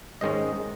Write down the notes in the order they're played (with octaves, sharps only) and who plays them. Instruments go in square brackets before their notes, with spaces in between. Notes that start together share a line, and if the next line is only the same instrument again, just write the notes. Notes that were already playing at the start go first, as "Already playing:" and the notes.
[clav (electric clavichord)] G#2 D#3 G#3 C#4 D#5